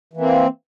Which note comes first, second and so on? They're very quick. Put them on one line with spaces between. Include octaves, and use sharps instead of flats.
E3 A#3 C4